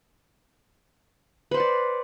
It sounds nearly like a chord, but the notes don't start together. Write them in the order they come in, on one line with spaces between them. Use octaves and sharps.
B4 C5 F#5 D5